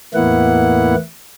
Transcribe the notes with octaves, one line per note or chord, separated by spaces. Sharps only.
E2 A2 A#3 B3 E4 F#5